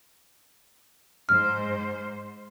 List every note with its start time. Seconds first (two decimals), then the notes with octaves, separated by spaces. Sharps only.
1.29 G#2 C5 F6